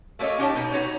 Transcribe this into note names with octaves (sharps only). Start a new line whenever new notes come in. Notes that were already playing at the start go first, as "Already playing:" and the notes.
A3 A#3 A4 C#5 D#5
C#4 D#4 G4 F#5 G5 A5
B2 D#4
B3 D#4 F#4 C#5